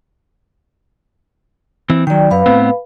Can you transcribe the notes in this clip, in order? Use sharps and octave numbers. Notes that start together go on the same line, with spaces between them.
E3 C4
D#3 F#3 D5 G5
F#2 B4 F5 B5
A2 B3 C4